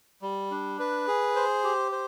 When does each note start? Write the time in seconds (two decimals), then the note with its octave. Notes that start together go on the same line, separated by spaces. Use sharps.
0.22 G3
0.51 D4
0.79 B4
1.07 G#4
1.36 C5
1.64 G4
1.92 C5